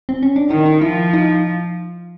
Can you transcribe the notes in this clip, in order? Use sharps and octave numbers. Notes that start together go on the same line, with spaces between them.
C4
C#4
D4
D#3 D#4
D#4
F3 E4
D#4